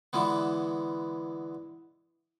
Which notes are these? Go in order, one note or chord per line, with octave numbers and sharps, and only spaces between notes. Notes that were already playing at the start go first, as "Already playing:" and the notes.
D3 E3 G#3 B3